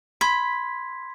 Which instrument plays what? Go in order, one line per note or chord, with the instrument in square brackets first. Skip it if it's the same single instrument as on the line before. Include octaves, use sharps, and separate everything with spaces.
[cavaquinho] B5 [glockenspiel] C6 G#6 B6